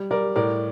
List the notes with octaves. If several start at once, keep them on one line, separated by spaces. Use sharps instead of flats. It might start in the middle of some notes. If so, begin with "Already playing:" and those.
Already playing: G3
G3 A#4 D5
A2 A#4 D5